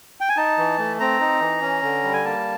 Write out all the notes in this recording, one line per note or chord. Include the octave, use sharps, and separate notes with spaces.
G5
G#5
D#4 A5
E3
A3
C4 A#5
D#4
E3
C#4
D3
G3
G#5
A#3 A5